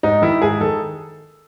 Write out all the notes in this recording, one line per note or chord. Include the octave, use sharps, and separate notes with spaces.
G#2 D#4
D#3 E4
G#2 G#4
D#3 A4